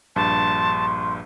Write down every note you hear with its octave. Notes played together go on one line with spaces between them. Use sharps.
A#1 G2 A5 C6